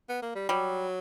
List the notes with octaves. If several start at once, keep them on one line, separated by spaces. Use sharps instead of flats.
B3
A#3
G3
F#3 G3